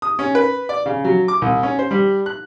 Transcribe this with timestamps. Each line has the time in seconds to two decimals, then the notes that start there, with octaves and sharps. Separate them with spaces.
0.02 D#6
0.19 C#4
0.35 B4
0.69 D5
0.86 C#3
1.04 F#3
1.28 D6
1.42 C2
1.63 C#4
1.79 C5
1.91 G3
2.26 F#6